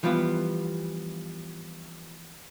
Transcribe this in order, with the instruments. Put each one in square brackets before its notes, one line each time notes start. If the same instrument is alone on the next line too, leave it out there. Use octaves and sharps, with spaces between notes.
[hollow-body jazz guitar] E3 F3 G3 B3 F4